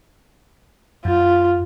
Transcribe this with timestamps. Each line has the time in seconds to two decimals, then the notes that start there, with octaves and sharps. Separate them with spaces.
1.05 F#2 F4